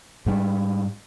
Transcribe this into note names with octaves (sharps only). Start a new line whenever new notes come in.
G#2 G3